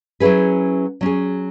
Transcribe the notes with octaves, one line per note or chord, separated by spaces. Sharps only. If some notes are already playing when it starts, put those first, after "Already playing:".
F#3 C#4 E4 G#4 B4
F#3 C#4 G#4